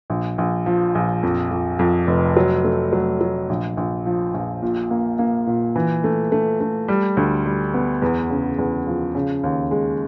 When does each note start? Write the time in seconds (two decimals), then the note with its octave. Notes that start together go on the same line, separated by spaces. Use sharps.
0.10 A#1
0.38 A#1
0.66 F3
0.95 A#1
1.23 F2
1.51 F2
1.79 F2
2.07 F1
2.37 F#3
2.64 A3
2.93 F#3
3.21 F#3
3.49 A#1
3.77 A#1
4.06 F3
4.34 A#1
4.62 A#2
4.91 A#3
5.19 A#3
5.47 A#2
5.76 E3
6.04 A3
6.32 A3
6.60 A3
6.88 G3
7.17 D2
7.46 G3
7.74 B3
8.02 E2
8.30 C#3
8.59 E2
8.87 F3
9.15 C#3
9.43 D#2
9.71 G#3